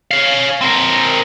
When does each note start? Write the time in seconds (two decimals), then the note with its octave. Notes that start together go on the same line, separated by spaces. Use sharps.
0.11 C#5 F5
0.61 C4 A#4